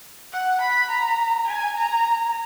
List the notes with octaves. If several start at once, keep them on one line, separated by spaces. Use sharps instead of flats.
F#5
B5
A#5
G#5
A#5